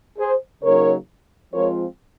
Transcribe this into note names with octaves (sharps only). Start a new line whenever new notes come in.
G#4 C5
C#3 F#3 A#3 D#4 A#4 C#5
F3 G#3 C4 F4 A#4 C#5